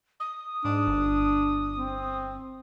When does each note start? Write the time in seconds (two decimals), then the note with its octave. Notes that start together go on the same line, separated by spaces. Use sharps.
0.20 D#6
0.65 G#2 D4
0.87 G1
1.78 C4